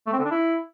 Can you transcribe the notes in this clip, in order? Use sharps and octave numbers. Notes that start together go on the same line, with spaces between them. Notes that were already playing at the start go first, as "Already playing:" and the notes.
A3
C4
D3
D4
E4